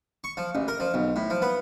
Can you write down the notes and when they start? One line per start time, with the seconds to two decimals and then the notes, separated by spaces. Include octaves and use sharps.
0.24 C#6
0.37 F3
0.55 A1
0.68 A#4
0.80 F3
0.94 B1
1.16 A2
1.30 F3
1.42 B3